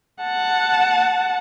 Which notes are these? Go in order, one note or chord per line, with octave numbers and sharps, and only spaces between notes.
F#5 A5